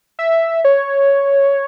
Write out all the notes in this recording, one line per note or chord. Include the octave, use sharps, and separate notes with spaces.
E5
C#5